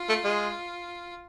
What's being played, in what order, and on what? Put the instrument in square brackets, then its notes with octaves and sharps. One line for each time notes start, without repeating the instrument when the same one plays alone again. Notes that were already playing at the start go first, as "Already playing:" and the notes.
Already playing: [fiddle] F4
[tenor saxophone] A3
G#3